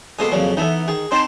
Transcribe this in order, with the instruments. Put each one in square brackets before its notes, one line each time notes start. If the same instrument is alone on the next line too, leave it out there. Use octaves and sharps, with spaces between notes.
[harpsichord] B2 C5 D#6 [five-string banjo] G#3 A#3 A4
[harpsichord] F2 C#3 F#3 [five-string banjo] A#3 D5
[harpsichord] E3 B3 [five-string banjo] D#4 A4 E5
[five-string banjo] D#3 [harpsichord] G#4
[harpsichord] C4 A5 [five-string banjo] D#4 [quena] C6